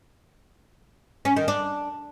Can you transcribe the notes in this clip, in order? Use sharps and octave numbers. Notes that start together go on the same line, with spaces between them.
C#4
D#3
D4